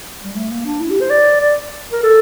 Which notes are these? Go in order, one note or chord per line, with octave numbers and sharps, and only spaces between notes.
G3
A3
A#3
D4
E4
G4
C5
D5
D5
A#4
A4